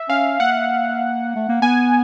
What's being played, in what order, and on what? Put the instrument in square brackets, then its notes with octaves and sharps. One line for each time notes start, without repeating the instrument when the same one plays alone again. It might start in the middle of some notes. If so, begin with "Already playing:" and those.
Already playing: [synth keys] E5
[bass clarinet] C#4 [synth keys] F5
[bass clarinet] A#3 [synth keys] F#5
[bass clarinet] A3
A#3
[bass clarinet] B3 [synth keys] G#5